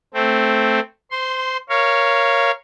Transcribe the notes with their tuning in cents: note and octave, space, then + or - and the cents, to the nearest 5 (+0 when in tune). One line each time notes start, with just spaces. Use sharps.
A3 +0 C4 +0
C5 -20 C6 +0
A#4 +5 C#5 +0 F5 -20